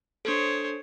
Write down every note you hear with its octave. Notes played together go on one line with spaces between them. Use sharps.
D4 A4 C5 C#5